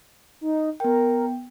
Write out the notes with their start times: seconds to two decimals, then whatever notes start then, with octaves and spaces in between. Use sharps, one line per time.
0.41 D#4
0.80 B3 A#4 G5